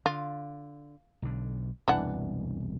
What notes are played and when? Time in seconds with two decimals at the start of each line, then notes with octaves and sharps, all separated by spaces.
0.06 D3 F4
1.22 B1 D3
1.88 E1 C2 F#2 E3 D4 F#5